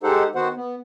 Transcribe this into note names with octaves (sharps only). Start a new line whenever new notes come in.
G#3 D#4 G4 A4 C5 F#5
D#3 B3 F#4 C5 F#5
B3